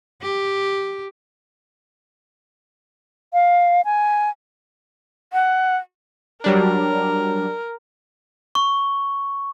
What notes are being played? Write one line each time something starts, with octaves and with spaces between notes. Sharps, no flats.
G4
F5
G#5
F#5
F#3 G3 D4 A#4
C#6